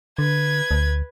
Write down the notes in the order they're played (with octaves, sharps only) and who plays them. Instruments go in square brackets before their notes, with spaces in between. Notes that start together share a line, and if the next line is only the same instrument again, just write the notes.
[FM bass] D3 [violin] B4 G#6
[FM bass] D2